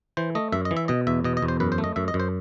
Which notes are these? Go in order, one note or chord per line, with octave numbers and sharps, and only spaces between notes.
E3 C5
A3 D#5
F#2 E5
D#5
E3
E5
B2 D#5
E2 E5
B2 D#5
D#5
E2
C5
F#2 B4
C5
A3
D#5
F#2 E5
D#5
F#2
C5